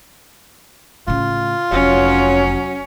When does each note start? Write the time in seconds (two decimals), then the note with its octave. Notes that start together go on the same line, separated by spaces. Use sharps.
1.08 A2 C#3 F4
1.72 F1 F#3 C#4